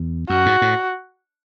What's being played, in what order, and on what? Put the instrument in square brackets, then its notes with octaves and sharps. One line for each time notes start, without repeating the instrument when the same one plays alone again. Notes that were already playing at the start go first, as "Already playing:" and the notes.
Already playing: [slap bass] E2
[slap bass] F#2 [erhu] F#4
[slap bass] G#2
A2